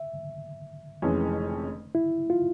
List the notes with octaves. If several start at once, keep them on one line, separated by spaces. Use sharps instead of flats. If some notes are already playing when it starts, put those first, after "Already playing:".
Already playing: E5
F1 F2 E3 G#3 C#4
E4
F4